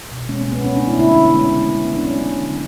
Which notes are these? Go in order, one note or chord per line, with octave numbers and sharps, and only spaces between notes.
B2
G#3 C#4
B3
B2
B3
F#3 C#4
D4
A3
E4
D3 E4
C#4
D3
B3
G#3 C#4
C#4
C#3
B3
G#3
B3
C#3
D4
F#3 C#4
A3
D3